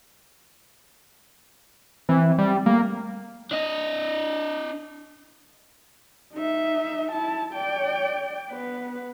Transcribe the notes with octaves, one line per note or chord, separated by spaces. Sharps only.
E3 C4
G3
G3 A3 A#3
D4 D#5
D#4 E5
E4 A5
D5 G5
B3 B4